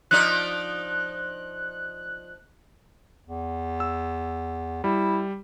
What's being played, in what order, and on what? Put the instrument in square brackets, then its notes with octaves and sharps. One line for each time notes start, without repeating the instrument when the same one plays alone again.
[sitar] F3 D#4 D5 [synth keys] F#6
[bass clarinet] E2
[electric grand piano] E6
[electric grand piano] G3 [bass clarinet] E4